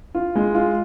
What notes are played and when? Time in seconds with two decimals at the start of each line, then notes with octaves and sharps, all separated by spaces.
0.15 F4
0.35 G#3
0.55 F4